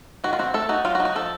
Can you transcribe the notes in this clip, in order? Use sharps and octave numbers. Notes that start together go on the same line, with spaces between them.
D#3 F#4
F4
C4 F#4
A3 A4
D#4 F#4
F#3 F4
F#4
D#4
F#4
F3 A4